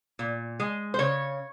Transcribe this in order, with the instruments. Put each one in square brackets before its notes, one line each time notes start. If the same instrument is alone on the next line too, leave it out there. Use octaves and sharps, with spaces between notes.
[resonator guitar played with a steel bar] A#2
G#3
C5
C#3 C#5